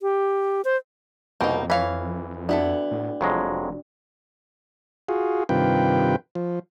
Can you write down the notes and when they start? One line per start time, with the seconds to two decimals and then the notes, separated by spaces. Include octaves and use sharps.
0.02 G4
0.65 C5
1.41 C2 F2 B2 A#3 D#4 G5
1.70 E3 C#5 F5 B5
2.49 B3 D4 E4 F#4 A4 D5
2.91 A2
3.21 F1 F2 F#3 G#3
5.09 F4 F#4 G#4
5.49 G2 C3 D#3 F4 B4 G5
6.35 F3